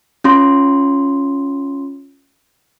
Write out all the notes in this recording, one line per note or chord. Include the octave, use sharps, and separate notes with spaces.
C#4 F4 C6